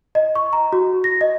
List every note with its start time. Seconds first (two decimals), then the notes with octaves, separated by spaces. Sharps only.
0.15 D#5
0.35 C#6
0.53 A#5
0.73 F#4
1.04 A#6
1.21 D#5